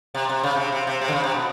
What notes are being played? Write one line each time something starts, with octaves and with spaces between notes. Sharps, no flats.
C3
C3
C#3
C3
C3
C3
C3
D3
C#3
C3
B2